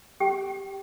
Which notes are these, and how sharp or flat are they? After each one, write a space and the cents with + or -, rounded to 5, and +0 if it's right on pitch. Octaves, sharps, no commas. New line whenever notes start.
G4 +0 G5 -15